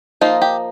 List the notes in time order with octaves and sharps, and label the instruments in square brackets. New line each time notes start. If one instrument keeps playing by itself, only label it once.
[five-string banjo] F3 A#3 D#4 F4
G4